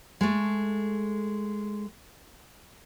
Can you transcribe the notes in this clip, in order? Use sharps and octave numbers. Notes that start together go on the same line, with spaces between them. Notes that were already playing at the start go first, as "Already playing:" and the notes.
G#3 A3